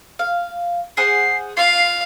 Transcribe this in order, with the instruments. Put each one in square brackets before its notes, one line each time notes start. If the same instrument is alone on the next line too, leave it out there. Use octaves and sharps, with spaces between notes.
[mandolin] F5
[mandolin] G#4 C5 F#5 [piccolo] C7
[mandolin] F4 [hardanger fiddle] F5 [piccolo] C7